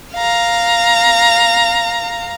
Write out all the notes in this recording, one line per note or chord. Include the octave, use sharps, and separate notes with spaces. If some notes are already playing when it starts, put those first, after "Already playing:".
F5 A#5